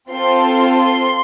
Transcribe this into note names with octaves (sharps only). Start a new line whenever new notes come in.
C4 F4 A4 C6
C6